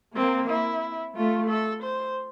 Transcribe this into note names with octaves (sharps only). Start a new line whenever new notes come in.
A#3 C4
E4
A3 F4
A4
C5